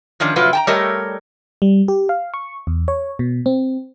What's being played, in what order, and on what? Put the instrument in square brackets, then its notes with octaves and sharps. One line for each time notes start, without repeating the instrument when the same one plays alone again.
[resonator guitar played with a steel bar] D#3 F3 C#4 D4
A2 C3 F3 F#3 F4 B4
G5 A5 A#5
G3 A3 G4 A#4 C#5 D#5
[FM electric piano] G3
G4
F5
C#6
E2
C#5
B2
C4